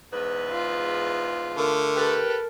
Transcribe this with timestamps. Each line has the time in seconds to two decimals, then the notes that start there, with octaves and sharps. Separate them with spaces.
0.12 E2 G#2 B4
0.50 F4
1.57 D3 A3 A#4
1.95 G4 A4 B4